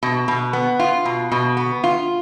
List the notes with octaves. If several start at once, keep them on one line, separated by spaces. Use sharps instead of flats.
B2
B2
B3
F4
B2
B2
B3
F4